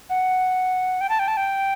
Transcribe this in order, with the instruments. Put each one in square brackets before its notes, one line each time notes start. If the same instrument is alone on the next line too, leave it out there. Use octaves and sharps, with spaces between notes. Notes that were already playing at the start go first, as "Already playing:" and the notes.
[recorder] F#5
G5
A5
G5
A5
G5